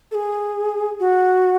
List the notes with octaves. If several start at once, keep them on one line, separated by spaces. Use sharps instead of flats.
A4
G#4
F#4